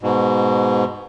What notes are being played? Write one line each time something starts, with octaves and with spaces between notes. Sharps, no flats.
G#2 B2